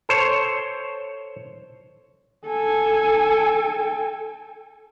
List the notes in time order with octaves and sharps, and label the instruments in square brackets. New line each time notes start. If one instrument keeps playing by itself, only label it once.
[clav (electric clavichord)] A4 C5 C#5
[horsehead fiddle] A4 G#5